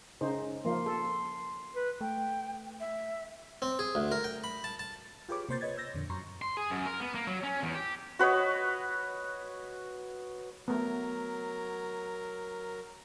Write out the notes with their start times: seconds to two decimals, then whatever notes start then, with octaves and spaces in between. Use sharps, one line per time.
0.21 C#3 D#4 C5
0.65 F3 A#3 C6
0.86 A4
1.76 B4
2.01 A3 G5
2.80 E5
3.62 C4
3.79 G#4
3.95 D2
4.12 A#4
4.24 G5
4.44 B5
4.64 A5
4.79 A5
5.29 F4 G4 G#4 B4 C#5 D6
5.49 C3 A#3 C5 G6 A6
5.61 B4 C#5 D#5 G#6 A6
5.77 E6 G6 A6 A#6
5.94 F2 A#2 D3
6.10 F#2 A#5 C6 C#6
6.42 C6
6.57 G#4
6.70 F#2
6.86 A#4
7.00 B3
7.15 A#3
7.27 F#3
7.43 C#4
7.63 E2
7.74 G4
8.19 F#4 B4 C#5 D#5
10.68 F#3 A3 B3 A#4